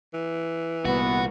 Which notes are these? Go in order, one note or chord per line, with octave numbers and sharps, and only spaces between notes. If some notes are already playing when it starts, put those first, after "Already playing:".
E3
C2 A#2 B3 F#4